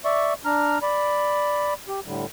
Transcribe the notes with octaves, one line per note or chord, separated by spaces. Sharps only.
D5 E5 C#6
D4 A#5 F6
D5 B5
G4
A2 D3 G3